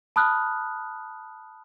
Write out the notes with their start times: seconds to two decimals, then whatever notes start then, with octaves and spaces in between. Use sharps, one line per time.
0.16 A5 B5 D#6 F6 F#6